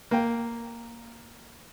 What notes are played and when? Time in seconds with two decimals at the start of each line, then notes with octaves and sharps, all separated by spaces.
0.11 A#3 G5